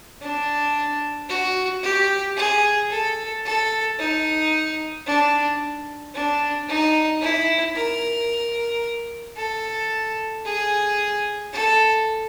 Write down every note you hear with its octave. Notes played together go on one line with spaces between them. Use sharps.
D4
F#4
G4
G#4
A4
A4
D#4
D4
D4
D#4
E4
A#4
A4
G#4
A4